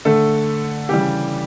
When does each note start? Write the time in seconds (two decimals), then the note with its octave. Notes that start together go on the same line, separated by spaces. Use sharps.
0.05 D3 A3 A4
0.89 C#3 E3 G3 G4